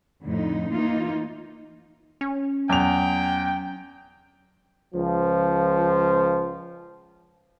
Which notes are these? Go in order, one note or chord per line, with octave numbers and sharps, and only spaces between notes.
F2 A2 D3 D#4
E3 A#3 D#4 F4
C#4
E2 F#3 G5 F7
C#2 F3